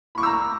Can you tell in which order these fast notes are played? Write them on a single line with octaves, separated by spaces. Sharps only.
B5 C#6 D6 E6 A#5